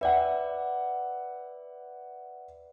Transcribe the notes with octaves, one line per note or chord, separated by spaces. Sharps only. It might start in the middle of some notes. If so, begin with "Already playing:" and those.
B4 D5 E5 F#5